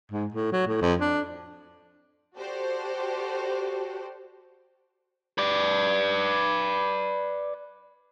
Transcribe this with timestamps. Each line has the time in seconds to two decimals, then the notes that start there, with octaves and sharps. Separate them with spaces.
0.11 G#2
0.33 A2
0.53 F#3
0.67 A2
0.81 F2
1.00 D4
2.38 F#4 G4 A4 C5 D5
5.38 B4 D5